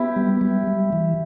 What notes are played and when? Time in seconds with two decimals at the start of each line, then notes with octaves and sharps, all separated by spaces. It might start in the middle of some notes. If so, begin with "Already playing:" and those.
Already playing: B3 E4 G4
0.16 G3
0.41 G3
0.67 G3
0.93 E3